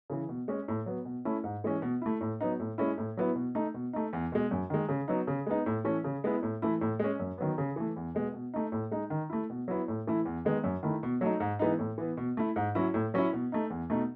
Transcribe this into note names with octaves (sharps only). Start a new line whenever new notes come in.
C#3 E3
B2
G#3 C#4
A2
F#3 B3
B2
A3 C#4 E4
G#2
E3 G#3 C#4
B2
A3 E4
A2
F#3 B3 D#4
A2
G#3 C#4 E4
A2
F#3 B3 E4
B2
A3 D#4
B2
A3 D#4
E2
B2 G#3
F#2
D#3 G#3
C#3
F#3 B3 D#4
C#3
G#3 B3 D#4
A2
E3 A3 C#4
C#3
G#3 B3 E4
A2
E3 A3 E4
A2
G#3 C#4
F#2
D#3 F#3 B3
C#3
E3 A3
E2
B2 G#3 B3
B2
A3 D#4
A2
G#3 D#4
D#3
A3 E4
B2
F#3 B3 E4
A2
E3 A3 E4
E2
D#3 G#3 B3
F#2
D#3 A3 E4
B2
F#3 A3 D#4
G#2
E3 G#3 B3 D#4
A2
E3 B3
B2
A3 E4
G#2
F#3 C#4 E4
A2
F#3 C#4 E4
B2
A3 D#4
E2
B2 A3 D#4